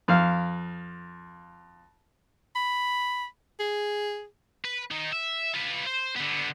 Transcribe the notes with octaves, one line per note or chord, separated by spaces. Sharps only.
F2 F5 F6
B5
G#4
B4
D#3 D#4
E5
F4 B4
C5
D3 B3